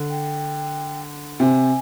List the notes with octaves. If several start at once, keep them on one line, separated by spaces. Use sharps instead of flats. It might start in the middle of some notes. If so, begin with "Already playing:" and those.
Already playing: D3
G5
C3 G#5